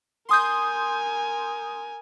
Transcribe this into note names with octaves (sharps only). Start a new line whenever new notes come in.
A#4 G#5 C6 D#6 G6